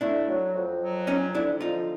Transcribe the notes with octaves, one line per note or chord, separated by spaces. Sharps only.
A3 D4 E4
F#3
F2
F#3
F2 C#4 D#4
D3 D4 E4
F3 D#4 F4